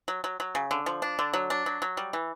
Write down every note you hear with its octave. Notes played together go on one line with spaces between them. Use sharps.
F#3
F#3
F#3
C#3
D3
F3
D4
D3
F#3
D4
F#3
F#3
G3
E3